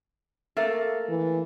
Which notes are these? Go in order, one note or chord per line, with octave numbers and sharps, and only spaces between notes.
A3 A#3 A4
E3